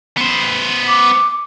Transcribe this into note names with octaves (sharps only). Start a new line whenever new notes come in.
B3 C5
D6